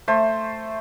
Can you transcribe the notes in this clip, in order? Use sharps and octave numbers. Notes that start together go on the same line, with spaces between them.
A3 C5